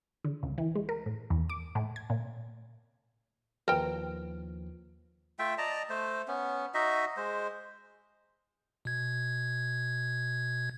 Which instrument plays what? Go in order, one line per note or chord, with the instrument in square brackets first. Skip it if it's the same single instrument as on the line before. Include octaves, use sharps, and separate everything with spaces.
[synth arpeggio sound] D3
C#2
E3
G#3
A#4
A2
E2
D6
A2
G#6
A#2
[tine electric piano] D#2 F3 [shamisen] A#4 G5 [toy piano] B4
[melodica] A3 F4 E5 G5
D5 D#5 A5 A#5
A3 C5
B3 C#4
D#4 F#4 D#5 E5
G#3 C5
[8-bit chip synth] B2 G#6